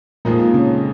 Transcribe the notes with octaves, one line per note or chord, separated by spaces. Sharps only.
F2 A#2 F3 G#3 A#3 D#4
C#3 C#4